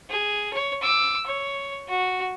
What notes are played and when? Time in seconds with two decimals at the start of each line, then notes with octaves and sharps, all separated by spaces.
0.10 G#4
0.53 C#5
0.82 D6 E6
1.26 C#5
1.88 F#4